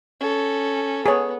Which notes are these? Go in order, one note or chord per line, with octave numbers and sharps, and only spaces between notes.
C#4 A4
B3 G#4 C#5